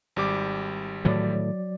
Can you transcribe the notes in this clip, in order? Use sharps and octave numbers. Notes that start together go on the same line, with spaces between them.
G#1 G3 D6
A2 D#3 E3 F#3 D5